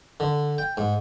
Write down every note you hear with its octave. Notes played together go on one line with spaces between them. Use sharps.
D3
G5
G#2